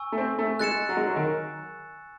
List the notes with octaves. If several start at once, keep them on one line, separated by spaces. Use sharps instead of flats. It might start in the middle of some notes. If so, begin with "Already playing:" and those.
Already playing: G#5 C#6 E6
A3
C4
A3
G#3 F#6 A6 C#7 E7
F#3
G#3
F#3
D#3